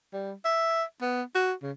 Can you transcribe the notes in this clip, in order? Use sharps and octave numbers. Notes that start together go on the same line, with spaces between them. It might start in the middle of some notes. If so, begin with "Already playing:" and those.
G3
E5
B3
F#4
C#3